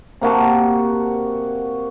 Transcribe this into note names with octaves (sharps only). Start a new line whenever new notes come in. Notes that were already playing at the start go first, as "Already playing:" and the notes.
C3 A#3 F#4 A5